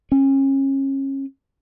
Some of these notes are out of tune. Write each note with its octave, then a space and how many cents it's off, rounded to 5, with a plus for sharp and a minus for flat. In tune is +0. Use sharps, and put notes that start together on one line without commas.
C#4 -30